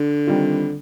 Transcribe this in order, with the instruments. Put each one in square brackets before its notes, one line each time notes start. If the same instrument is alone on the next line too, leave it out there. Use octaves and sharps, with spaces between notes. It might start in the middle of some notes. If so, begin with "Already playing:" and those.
Already playing: [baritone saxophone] D3
[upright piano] D#3 G3 C4 F4